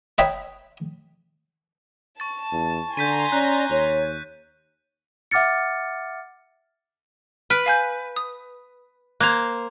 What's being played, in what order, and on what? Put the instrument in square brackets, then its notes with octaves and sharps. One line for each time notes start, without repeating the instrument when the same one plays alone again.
[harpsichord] B4 C#5 D#5 E5 G5 A#5
[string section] A5 [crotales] C#6 A6
[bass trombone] E2
[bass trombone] D3 [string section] G#5 A#5 C6 [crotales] G6 B6 D#7
[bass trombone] C#4 [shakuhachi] D5 [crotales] F#6
[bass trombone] D#2 [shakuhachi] C#5
[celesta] E5 F#5 D6 F6 A6 C#7
[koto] B4 [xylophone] F6 B6 D7
[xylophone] F5 G#5 G6
D#6
[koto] A#3 C5 [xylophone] F#6 G#6 F7